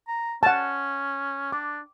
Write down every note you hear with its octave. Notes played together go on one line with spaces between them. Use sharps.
A#5
C#4 F#5 A5
D4 D6